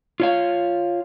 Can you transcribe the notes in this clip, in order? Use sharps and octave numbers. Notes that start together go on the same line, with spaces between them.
F4 C#5 F5